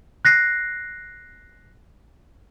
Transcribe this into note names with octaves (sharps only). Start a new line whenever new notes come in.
F#6 A#6 C7